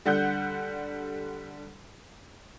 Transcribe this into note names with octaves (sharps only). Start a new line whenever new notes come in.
D3 G3 F#5 F#6 G6